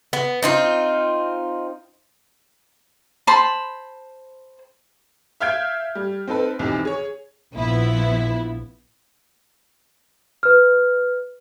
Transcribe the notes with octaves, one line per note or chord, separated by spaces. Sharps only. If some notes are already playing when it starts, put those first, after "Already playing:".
B3
C4 D#4 F4
C5 A5 B5
E5 F5 F6 G6 G#6 D7
G3
C4 D#4 A4 B4
B1 E2 C3 D#3
G#4 C#5
A#1 F3 B3 E4
B4 F6